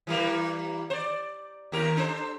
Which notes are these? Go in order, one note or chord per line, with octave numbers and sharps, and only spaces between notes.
E3 G3 A#3
C5 D5
D#2 G4 A#4
D4 A4 C5